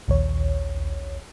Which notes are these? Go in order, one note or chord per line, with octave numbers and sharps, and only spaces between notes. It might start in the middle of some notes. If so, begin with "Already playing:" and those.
A#1 D#2 C#5